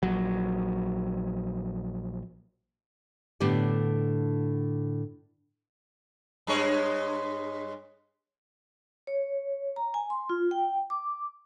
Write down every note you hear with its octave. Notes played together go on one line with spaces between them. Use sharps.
A#1 F#3
A2 D3 B3 D4 G4 D5
G2 G#3 C#5
C#5
A#5
G#5
C6
F4
G5
D6